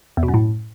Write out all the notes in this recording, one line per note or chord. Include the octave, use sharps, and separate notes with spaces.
E2
B2
F#2
A2